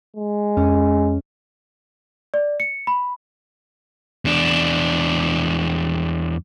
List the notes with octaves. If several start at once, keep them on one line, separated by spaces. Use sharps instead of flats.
G#3
F2 C#4
D5
C#7
B5
E2 D4